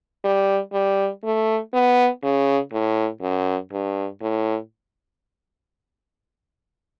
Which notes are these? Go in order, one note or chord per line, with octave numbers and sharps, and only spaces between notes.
G3
G3
A3
B3
C#3
A2
F#2
G2
A2